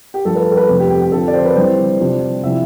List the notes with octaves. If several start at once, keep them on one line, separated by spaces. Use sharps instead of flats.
G4
G2 F3 A3 A4
B4
A4
B4
F2 C3 F3 A3 C4
G4
G4
G4
D3 F3 C4 A4
D5
C5
B4
D3 G3 C4 E4 C5
C3 G3 D4 F4
C3 F3 C4 E4 E5